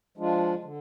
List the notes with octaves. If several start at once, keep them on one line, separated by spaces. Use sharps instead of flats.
F3 G#3 D4 F4
D3